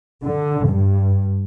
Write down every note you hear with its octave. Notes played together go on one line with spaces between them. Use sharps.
D3
G2